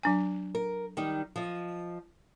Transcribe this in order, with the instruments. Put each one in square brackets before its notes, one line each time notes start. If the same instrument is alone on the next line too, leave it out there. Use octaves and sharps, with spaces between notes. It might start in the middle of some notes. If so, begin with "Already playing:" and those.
[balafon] F#3 D4 G#5
[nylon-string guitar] A#4
D#3 G3 D#4
F3 D#5